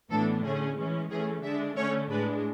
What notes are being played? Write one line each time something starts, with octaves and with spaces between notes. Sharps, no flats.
A2 E3 B3 D4 A4
D3 A3 C#4 G#4
E3 G#3 C#4
E3 A3 C#4 G#4
D3 G#3 D4 E5
D3 A3 C#4 C#5
A2 G#3 D4 B4